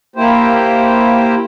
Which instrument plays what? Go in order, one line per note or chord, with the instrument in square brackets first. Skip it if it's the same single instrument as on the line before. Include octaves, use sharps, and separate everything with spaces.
[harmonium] A#3 E4 G4 C5